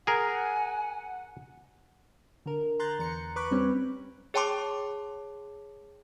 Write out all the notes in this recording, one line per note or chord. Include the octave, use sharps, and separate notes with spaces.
G#4 A#4 F#5 G#5
D3 A#4
A#5 C6 F#6 G6 A6
E2 A#5 C#7
A#5
B4 B5 C#6 D6 F#6
G3 C4 C#4
G#4 C#5 G5 A5 C6 D6